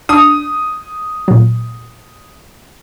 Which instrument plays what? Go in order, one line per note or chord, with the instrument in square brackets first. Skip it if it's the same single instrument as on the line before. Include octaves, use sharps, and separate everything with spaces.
[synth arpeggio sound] D4 [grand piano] D#6
[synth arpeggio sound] A#2 F#3